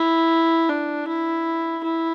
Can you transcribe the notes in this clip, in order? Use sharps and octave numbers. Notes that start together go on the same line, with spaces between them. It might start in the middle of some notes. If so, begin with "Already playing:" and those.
Already playing: E4
D4
E4
E4